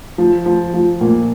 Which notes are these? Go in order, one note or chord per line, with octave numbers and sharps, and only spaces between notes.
F3
F3
F3
A#2